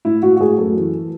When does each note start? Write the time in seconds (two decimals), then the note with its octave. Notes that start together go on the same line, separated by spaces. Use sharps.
0.05 A2 E4
0.22 A2 F#4
0.36 F#4
0.40 A2 G#4
0.58 F#2 A4
0.76 E3